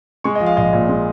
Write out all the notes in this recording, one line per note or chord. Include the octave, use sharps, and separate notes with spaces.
G#3 C#6
D#5
F3
F5
A#1 D#5
A#2
G#3